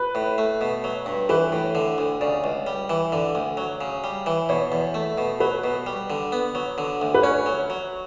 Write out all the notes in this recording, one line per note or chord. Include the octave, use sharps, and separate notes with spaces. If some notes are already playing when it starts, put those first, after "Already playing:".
Already playing: B4
A2
A3
B2
F#3
G2
E3 B4
A2
D3
D2
C#3 D5
C#2
G3
E3
D3 D5
D2
F#3
C#3
G3
E3
B2 C#5
E2
A3
B2
F#3 B4
B2
G3
D3
B3
F#3
D3
D2
B4
C#4 C#5
F#3
F#3